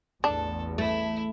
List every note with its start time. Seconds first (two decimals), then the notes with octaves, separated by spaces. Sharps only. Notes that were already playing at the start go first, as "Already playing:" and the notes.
0.24 A1 E2 D4 A4
0.78 A3 E4